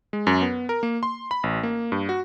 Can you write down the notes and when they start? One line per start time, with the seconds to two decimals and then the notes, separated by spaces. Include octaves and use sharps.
0.13 G#3
0.27 F#2
0.41 B3
0.69 A#4
0.83 A#3
1.03 C6
1.31 B5
1.43 A1
1.63 A#3
1.92 G2
2.09 F#4